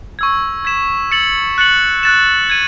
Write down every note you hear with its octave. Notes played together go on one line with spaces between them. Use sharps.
C#6 E6 G#6
G#6 B6 E7
E6 A6 C#7 F#7
F#6 A6 C#7 F#7
F#6 A6 E7
G#6 D#7